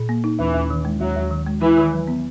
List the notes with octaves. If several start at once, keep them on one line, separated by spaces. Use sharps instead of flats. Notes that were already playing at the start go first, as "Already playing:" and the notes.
Already playing: A#2
A#3
D#4
D#2 E3
D#2
D#3
G#3
D#2 F#3
D#2
D#3
G#3
E3 E4
D#3
F#3
B3